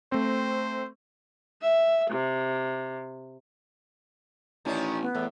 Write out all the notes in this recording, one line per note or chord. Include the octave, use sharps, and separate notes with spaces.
A3 C4 C5
E5
C3
A1 D#3 C#4 D4
B3
E2 A2